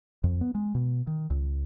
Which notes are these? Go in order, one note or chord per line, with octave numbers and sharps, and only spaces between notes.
F2
B3
G#3
B2
D#3
C#2